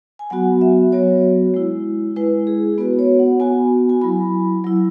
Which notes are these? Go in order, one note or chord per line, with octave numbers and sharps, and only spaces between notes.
G#5
F#3 B3 F#4 F#5
E5
F#3 B3 F#4 C#5
G#3 E4
G#3 E4 B4
G#4
B3 F#4 B4
C#5
F#5
B3 F#4 G#5
G#5
F#3 E4 B5
F#3 E4